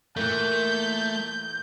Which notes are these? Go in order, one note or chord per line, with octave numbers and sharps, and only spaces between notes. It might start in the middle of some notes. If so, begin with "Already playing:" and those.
A#2 E3 A3 A#3 G6